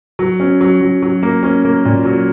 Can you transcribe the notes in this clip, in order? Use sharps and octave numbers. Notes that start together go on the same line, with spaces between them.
F#3
C#4
F#3
F#3
F#3
A#3
C#4
A#3
A#2
F#3